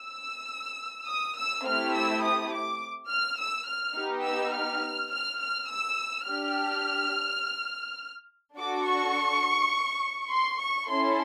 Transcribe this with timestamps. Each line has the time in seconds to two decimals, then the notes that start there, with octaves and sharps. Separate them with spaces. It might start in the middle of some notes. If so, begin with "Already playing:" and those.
Already playing: E6
1.08 D#6
1.37 E6
1.65 A3 C4 E4 G4 F6
1.94 E6
2.23 D#6
2.53 D6
3.10 F6
3.39 E6
3.68 F6
3.97 B3 D#4 G4
4.25 E6
4.54 F6
5.12 F6
5.40 F6
5.70 E6
6.27 D4 G4 F6
8.57 D4 F#4 A4 D6
8.86 C#6
10.31 C6
10.60 C#6
10.89 C#4 E4 A4 C6